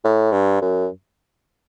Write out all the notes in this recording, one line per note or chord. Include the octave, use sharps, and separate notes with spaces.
A2
G2
F#2